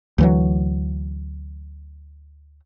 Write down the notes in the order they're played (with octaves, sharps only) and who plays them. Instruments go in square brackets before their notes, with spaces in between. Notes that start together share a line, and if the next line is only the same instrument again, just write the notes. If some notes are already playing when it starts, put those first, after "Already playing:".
[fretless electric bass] D2 E3 F#3